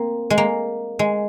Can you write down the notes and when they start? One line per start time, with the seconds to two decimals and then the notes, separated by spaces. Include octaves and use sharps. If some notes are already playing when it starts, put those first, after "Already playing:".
Already playing: A#3 C4
0.30 G#3
0.38 A#3
0.99 G#3